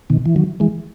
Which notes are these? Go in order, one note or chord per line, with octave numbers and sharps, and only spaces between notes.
B2 D#3
E3
D#3 F#3
E3 G#3